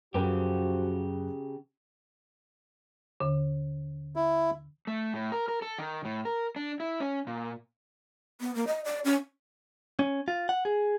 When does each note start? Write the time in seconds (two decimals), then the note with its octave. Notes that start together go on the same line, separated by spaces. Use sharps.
0.14 F#2 C#3 F3 F#4 G4 A#4 B4 G5
3.20 D#2 D3
4.16 E4
4.87 A3
5.14 A2
5.32 A#4
5.48 A#4
5.62 A4
5.78 D#3
6.05 A2
6.25 A#4
6.56 D4
6.80 E4
7.00 C#4
7.27 A#2
8.41 B3
8.55 A#3
8.67 D#5
8.85 D5
9.05 C#4
9.99 C#4
10.28 F4
10.49 F#5
10.65 G#4